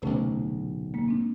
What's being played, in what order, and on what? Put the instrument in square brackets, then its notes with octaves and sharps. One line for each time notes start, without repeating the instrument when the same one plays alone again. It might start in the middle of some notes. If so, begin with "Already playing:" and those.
[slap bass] D1 B1 [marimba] C3 A3 C#4
[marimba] G#3 A#3
C4 D4